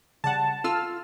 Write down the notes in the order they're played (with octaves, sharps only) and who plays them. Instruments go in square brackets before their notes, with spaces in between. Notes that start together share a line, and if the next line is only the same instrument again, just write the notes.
[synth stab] C#3 G3 F#5 [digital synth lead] A5
[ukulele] F4 [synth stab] A4 E6 F6